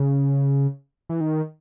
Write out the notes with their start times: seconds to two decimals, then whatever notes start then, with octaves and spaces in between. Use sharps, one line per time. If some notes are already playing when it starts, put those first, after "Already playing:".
Already playing: C#3
1.09 E3
1.21 D#3